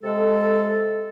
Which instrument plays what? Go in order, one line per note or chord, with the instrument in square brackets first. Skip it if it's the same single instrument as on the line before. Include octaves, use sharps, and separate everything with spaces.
[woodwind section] C3 G#3 A4